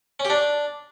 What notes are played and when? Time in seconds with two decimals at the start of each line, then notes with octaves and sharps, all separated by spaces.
0.20 C#4
0.25 G4
0.30 D4